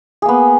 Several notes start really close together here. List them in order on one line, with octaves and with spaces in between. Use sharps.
G#4 A#3 B3